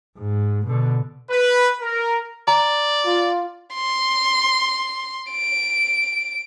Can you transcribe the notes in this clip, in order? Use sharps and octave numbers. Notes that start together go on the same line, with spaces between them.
G#2
B2 D3
B4
A#4
D5 A#5
F4
C6
D7